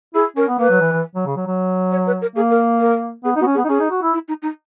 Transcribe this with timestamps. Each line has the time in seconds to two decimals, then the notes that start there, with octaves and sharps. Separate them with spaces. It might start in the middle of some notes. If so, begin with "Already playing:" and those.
0.14 E4 G#4
0.36 C#4 A#4
0.48 B3
0.59 A#3 B4
0.70 F#3
0.80 E3
0.92 E3
1.15 F#3
1.26 C#3
1.36 F#3
1.47 F#3
1.92 C#5
2.07 B4
2.22 A#4
2.36 A#3 G#4
2.51 A#4
2.80 A#4
3.24 B3 G#4
3.36 D#4
3.40 B3 F#4
3.46 C#4
3.55 G#4
3.57 B3
3.65 D#4
3.69 C#4 G#4
3.80 D#4
3.90 F#4
4.02 E4
4.13 E4
4.28 D#4
4.42 D#4